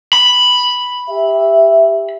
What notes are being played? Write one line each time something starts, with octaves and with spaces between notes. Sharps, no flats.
B5
G4 E5